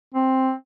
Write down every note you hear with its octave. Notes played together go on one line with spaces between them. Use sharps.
C4